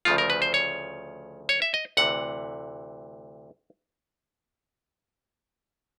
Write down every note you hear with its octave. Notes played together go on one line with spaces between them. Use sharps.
D2 C#3 F3 A3 F4
A#4
B4
C5
C#5
C#5
E5
D#5
D2 C3 E3 F#5